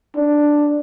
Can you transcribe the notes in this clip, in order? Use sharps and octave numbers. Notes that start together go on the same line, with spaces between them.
D4